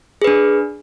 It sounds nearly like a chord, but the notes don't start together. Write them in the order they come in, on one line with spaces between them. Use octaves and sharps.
G#4 B4 D4